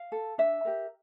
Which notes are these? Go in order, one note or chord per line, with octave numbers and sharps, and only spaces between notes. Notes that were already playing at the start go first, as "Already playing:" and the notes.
Already playing: F5
A4
D4 E5
G4 A#4